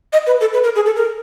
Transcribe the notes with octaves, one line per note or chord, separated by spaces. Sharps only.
D#5
B4
A4
B4
A#4
G#4
A4
A#4